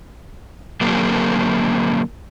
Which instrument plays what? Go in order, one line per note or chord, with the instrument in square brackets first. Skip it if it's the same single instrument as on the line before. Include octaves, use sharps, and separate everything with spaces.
[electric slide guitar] D3 F#3 A#3 C4 G#4 A#4